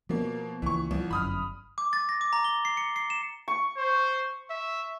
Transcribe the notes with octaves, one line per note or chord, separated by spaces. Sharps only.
B2 F3 A#3 B3
C#2 E3 A#3 C#6
C2 F3
G1 F#2 B5 D#6 F6
D6
A6
A#6
D6
A#5
G7
C7
C#7
C7
E7
C#6
C5
E5